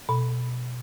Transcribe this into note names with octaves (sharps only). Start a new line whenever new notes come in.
B2